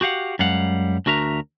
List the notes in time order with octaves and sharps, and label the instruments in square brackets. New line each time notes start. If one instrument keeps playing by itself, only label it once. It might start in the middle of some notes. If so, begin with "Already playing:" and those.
[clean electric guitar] F#4 G4 F5 F#5
F#2 G3 G#3 F5 F#5
D2 D4 F#4 A#4 E5 A#5